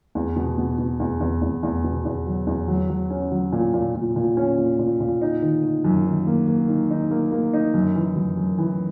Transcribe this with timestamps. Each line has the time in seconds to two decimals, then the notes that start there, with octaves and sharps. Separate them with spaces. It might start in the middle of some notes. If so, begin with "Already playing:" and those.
0.15 E2
0.36 B2
0.58 B2
0.78 B2
1.00 E2
1.21 E2
1.42 E2
1.63 E2
1.84 B2
2.05 E2
2.26 F#3
2.47 E2
2.68 F#3
2.89 F#3
3.10 C#4
3.32 F#3
3.52 A#2
3.74 A#2
3.95 A#2
4.16 A#2
4.37 C#4
4.58 A#2
4.79 A#2
5.00 A#2
5.21 D#4
5.42 D#3
5.63 D#3
5.84 F#2
6.06 D#3
6.27 A#3
6.48 A#3
6.68 D#3
6.90 D#4
7.11 A#3
7.32 A#3
7.53 D#4
7.74 F#2
7.96 E3
8.16 F#2
8.37 F#2
8.58 E3